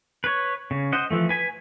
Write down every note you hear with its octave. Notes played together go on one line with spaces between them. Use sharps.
B4 C#5
C#3
C5 D#5 F#5
E3 F3 A3
B4 G#5 B5